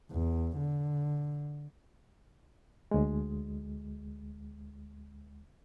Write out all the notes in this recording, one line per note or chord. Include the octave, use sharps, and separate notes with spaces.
E2
D3
D2 G#3